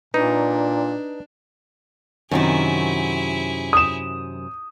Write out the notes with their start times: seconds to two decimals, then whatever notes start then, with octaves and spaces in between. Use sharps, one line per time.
0.14 A#2 D4 D#4 B4
2.31 F#2 C3 D#3 F#3 E4 G#4
3.73 D#6 E7